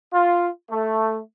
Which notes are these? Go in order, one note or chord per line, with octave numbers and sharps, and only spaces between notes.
F4
A3